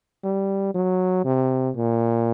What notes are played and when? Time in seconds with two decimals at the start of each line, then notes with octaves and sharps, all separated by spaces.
0.24 G3
0.74 F#3
1.24 C3
1.76 A#2